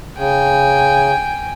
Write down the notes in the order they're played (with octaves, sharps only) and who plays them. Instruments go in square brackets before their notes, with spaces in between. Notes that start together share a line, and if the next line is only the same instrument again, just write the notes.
[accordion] C#3 [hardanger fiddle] G5 G#5